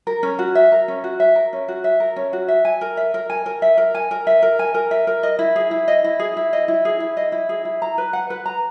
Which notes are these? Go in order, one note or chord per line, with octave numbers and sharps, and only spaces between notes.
A#4
C#4
F#4
E5
A#4
C#4
F#4
E5
A#4
C#4
F#4
E5
A#4
C#4
F#4
E5
G#5
A#4
E5
A#4
G#5
A#4
E5
A#4
G#5
A#4
E5
A#4
G#5
A#4
E5
A#4
D#5
E4
G#4
E4
D#5
E4
G#4
E4
D#5
E4
G#4
E4
D#5
E4
G#4
E4
A#5
B4
F#5
B4
A#5